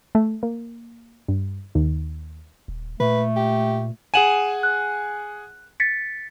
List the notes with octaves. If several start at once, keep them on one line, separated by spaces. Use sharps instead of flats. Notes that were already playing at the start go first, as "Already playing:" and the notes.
A3
A#3
G2
D#2
D#1
A#2 A3 B4
G4
G#4 F#5 G#5 D#7 E7 F#7
F#6
A6 B6 C#7